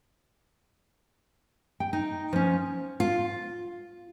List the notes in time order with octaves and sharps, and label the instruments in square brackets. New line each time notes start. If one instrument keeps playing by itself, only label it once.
[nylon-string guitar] G5
D#4
F3 C#4
F4